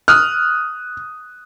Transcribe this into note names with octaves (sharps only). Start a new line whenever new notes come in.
D#6 F6 F#6